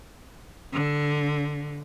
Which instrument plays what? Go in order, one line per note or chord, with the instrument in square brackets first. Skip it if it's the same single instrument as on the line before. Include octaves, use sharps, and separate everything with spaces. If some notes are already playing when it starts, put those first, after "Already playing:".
[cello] D3